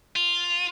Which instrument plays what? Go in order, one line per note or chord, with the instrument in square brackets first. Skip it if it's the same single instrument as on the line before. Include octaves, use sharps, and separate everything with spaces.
[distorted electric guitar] F4